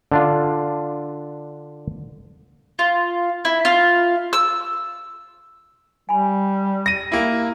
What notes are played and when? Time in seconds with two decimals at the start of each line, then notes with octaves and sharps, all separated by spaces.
0.12 D3 D4 F4
2.79 F4
3.45 E4
3.65 F4
4.33 E6
6.09 G3 G#5 B5
6.86 A#6 D#7
7.12 A#3 E4 G4 G5